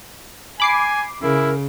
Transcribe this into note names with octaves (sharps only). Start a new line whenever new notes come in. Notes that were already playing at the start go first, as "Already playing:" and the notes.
G#5 B5 D6 C7
C#3 E4 A#4